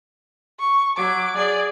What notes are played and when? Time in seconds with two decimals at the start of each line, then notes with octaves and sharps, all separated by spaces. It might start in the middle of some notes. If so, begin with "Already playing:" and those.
0.59 C#6
0.97 F#3 D6
1.37 G#4 D5